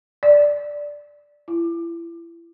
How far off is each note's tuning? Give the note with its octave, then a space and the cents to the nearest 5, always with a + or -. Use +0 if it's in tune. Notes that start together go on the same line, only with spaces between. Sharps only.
D5 -5
E4 +35